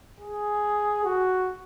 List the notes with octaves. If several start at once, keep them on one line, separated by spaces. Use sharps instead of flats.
G#4
F#4